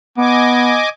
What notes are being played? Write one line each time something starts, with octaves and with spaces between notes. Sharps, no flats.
B3 D#5 G#5 D6